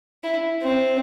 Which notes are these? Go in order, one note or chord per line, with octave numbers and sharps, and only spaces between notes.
E4
C4